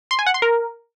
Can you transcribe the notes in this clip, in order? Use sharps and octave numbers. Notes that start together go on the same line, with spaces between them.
C6
G#5
F#5
C6
A#4